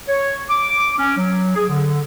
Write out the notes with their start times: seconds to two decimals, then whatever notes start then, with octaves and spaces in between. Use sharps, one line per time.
0.09 C#5
0.50 D6
0.98 C#4
1.18 F#3
1.56 G#4
1.69 D3